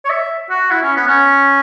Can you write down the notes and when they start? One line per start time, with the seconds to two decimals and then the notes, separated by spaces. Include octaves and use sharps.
0.05 C#5
0.10 E5
0.50 F#4
0.71 E4
0.83 C#4
0.96 B3
1.08 C#4